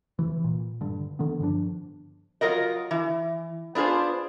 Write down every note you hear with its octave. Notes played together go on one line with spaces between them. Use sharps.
C3 E3
A#2
G2 D3
D3 D#3 B3
G2 F3 D4
F#3 F4 A#4 D#5
E3
B3 D4 F4 G#4 C5